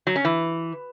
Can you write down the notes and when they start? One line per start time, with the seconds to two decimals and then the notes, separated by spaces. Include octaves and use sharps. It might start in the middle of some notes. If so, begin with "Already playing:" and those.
0.07 F#3
0.16 C#4
0.25 E3